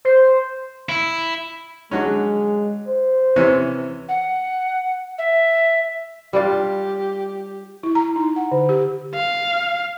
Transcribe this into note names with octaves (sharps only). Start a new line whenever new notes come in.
C5
E4
D3 F#3 G#3 C#4
C5
C3 E3 C#4
F#5
E5
G3 D4 F4 G4
E4
A#5
D#4
F#5
D3
G4
F5